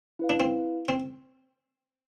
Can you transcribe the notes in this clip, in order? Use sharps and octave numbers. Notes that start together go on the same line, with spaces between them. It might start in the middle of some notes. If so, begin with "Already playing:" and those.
E4 B4 F5
D4
C4
C4